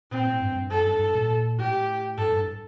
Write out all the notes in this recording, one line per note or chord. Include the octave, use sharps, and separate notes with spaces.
A#2 C4
A2
G2
G2
F#2 A4
G2
G2
A#2
A2 G4
G2 A4
G2